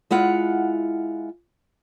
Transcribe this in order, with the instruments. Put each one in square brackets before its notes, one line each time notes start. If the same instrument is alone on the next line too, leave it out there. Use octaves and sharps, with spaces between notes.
[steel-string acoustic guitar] G#3 E4 F4 F#5